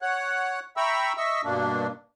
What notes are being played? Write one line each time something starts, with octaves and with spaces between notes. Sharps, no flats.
C#5 F#5 F#6
E5 G5 A#5 B5 C#6 E6
D#5 E5 C#6 E6
G2 B2 A#3 D4